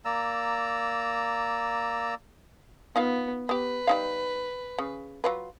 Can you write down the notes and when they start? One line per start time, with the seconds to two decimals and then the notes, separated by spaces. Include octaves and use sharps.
0.05 A#3 D5 A#5 E6
2.96 B3 D#4 F4 F5
3.49 B3 G4 B4
3.87 G3 D#4 F5
4.78 C#3
5.24 F#3 F4 B4